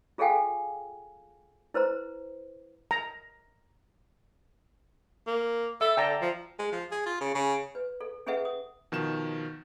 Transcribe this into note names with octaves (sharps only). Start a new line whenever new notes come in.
F4 G#4 A4 F5 G5 G#5
E4 B4 C5 A#5
A#5
A#3
A4 E5
D3 G5 A5 A#5
F3
G#3
F3
G#4
F4
C#3
C#3
B4
A4
C#4 G#4 A4 B4 E5 F#5
D#6
B2 D#3 F3 E7